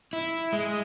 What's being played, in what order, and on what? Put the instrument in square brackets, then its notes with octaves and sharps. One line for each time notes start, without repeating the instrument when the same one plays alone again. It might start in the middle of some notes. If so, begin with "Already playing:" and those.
[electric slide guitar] E4
G#3